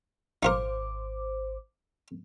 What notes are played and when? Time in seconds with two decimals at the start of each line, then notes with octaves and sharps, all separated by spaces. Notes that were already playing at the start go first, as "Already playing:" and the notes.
0.43 G#1 D#4 F4 A#4 C5 D6